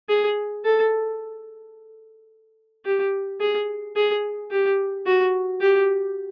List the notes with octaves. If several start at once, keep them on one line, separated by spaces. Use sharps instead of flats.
G#4
A4
G4
G#4
G#4
G4
F#4
G4